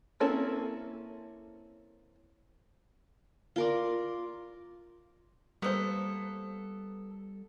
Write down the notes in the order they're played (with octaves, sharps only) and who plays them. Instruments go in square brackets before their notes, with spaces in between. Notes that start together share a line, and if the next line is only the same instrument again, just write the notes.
[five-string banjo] A#3 C4 C#4 E4 A4
[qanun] F4 A#4 D5
[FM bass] G3 [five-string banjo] A#3 C5 [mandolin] B3 A4